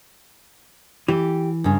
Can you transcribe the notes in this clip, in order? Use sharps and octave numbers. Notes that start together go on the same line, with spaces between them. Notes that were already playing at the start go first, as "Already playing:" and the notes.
E3 G4
G2 C#3